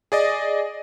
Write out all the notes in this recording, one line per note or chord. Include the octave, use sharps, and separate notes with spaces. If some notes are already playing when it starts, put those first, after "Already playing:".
G#4 D5 D#5